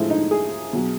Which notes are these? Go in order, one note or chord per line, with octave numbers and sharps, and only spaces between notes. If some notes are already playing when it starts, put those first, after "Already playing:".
Already playing: A2 F3 G#3 E4
D#4
G#4
B2 F#3